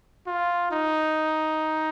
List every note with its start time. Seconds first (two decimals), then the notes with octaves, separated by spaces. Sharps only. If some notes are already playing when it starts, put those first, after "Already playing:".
0.27 F4
0.72 D#4